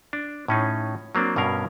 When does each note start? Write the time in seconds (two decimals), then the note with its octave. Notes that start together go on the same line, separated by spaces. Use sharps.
0.13 D4
0.48 A2 C#4 D#4 G#4
1.15 F#3 A#3 C4 D4
1.36 G2 B2 C#4 A#4 F5